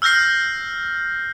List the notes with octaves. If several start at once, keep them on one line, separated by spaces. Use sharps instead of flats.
E6 F6 G6 A#6 C7